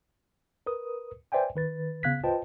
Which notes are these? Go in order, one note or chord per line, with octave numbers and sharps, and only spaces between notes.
A#4 B4 D#6
B4 C5 D5 E5 G5 G#5
D#3 B4 A6
C#3 B3 F5 F#6 G#6 B6
F4 B4 C5 D#5 G5 A5